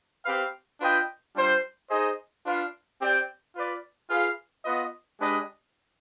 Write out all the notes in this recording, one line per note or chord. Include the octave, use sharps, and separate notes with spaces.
C4 G4 B4 F5
D4 F4 B4 D#5 G5
G3 D4 F4 C5
D#4 G#4 C5 D#5
D4 F4 B4 F5
C4 G4 D5 G5
F4 B4 D5
F4 G#4 B4 F5
B3 F4 B4 D#5
G#3 D4 G4 B4 D#5